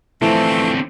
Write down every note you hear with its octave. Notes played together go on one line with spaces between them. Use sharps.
D3 E3 F3 A3 C4 E4 C5 F7